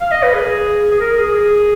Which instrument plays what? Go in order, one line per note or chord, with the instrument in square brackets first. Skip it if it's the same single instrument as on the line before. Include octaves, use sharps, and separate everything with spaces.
[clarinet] F5
D#5
B4
G#4
G#4
A#4
G#4
G#4